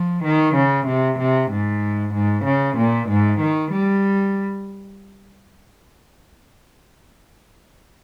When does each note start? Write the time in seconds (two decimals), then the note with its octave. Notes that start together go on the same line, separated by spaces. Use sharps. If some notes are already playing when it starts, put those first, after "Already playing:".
Already playing: F3
0.24 D#3
0.56 C#3
0.87 C3
1.19 C3
1.51 G#2
2.14 G#2
2.45 C#3
2.77 A#2
3.09 G#2
3.40 D#3
3.72 G3